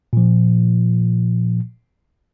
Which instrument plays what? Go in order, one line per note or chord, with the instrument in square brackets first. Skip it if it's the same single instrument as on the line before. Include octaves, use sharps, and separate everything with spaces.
[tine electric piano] A#2 F3